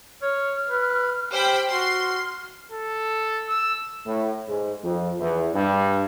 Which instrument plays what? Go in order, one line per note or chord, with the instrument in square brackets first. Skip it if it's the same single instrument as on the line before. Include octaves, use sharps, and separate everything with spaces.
[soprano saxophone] C#5 [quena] F6
[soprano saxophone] B4
[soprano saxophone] G4 [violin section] C5 G5 B5
[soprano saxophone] F#4 [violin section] C6 [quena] F6
[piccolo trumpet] A4
E6
[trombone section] A2
G#2
F2
E2
G2